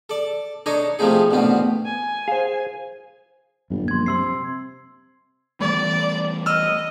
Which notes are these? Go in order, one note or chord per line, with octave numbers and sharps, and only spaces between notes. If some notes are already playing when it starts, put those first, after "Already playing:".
A4 D5
D4 D#4 A4 C#5 D#5
C3 F3 A3 C4 D#4 G#4
A1 D2 B2 B3 C4
G#5
G#4 C5 F5
G1 F#2 A#2 G3
A#1 C6 G#6
C3 C6 E6 C7
E3 G3 A3 D5
D#5 E6 F6